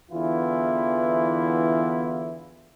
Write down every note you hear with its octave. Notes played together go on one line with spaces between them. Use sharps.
E2 D3 E3 B3 E4 F4